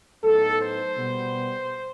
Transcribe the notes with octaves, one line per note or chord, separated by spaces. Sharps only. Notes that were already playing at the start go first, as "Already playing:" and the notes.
A2 F#3 B3 D#4 A4
C5
B2 G3 B3